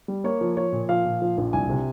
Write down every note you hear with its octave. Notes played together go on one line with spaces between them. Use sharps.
G3
A#3 C#5
F3
F3 C#5
A#2
F3 F5
A#2
F3
A#1
C2 G#5
C3